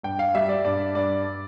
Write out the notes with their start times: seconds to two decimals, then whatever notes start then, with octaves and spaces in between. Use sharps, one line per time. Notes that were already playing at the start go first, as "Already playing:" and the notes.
0.03 G2 G5
0.19 F5
0.35 G3 E5
0.49 D5
0.65 G2 D5
0.95 G2 D5